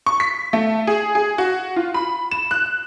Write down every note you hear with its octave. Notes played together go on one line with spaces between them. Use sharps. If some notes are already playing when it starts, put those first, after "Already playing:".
C#6
B6
A3
G#4
G#4
F#4
F4
B5
E7
F#6